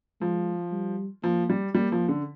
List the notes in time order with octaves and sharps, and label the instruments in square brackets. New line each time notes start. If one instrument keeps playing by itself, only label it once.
[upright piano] F3 [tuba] G#3
[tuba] G3
[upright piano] F3 [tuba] A#3
[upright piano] G3
[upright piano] G3 [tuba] A#3
[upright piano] F3
D3